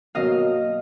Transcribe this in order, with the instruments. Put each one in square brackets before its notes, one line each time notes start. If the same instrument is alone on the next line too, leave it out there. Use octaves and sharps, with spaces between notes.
[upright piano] B2 F#3 A#3 [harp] D#5 F5